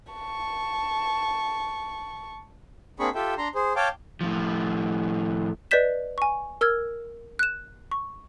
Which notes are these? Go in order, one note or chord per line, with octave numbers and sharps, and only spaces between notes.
A5 C#6
A#3 C4 D4 G#4 B5 C#6
F4 G4 A4 E5 G5
D4 A#5 C6
G#4 C5
C#5 F5 G5 A5 D6
A2 F3
B4 D5 D#5 G6 B6 E7
G#5 C#6
A#4 E6 F6 G#6
F#6 E7
C#6